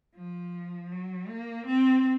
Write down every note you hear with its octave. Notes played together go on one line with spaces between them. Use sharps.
F3
F#3
A#3
C4